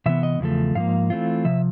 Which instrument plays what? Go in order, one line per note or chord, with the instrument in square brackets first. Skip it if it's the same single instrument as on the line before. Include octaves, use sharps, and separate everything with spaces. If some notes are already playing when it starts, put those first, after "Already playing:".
[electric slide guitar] C3 E3 B3 E5
D#5
E2 C#3 F3 A3
G#2 F3 A#3 F5
E3 A3 C4 F4
C3 F3 E5